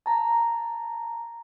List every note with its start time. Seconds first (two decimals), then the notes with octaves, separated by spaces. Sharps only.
0.06 A5 A#5